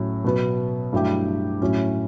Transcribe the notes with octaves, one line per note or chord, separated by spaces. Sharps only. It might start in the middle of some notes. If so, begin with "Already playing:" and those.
Already playing: A2 F#3 C#4
B2 F#3 B3
G2 F#3 A3 E4 G4
A2 F#3 C#4 E4